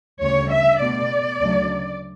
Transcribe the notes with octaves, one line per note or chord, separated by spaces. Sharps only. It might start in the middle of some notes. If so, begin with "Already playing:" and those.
D2 C#3 G3 C#5
E5
B2 A3 D5
D2 C#3 F#3 A3